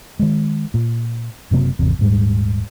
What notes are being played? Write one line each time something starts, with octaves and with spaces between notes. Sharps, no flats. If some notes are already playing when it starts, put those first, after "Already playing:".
D#3 G#3
A#2
F#1 C3 F#3 A#3
G#1 E2 C3
D#1 G#2 G3